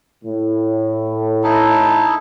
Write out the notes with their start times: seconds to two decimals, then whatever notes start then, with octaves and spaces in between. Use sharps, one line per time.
0.25 A2
1.44 D#4 E4 A4